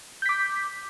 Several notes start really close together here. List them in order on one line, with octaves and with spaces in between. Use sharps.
G6 B6 D6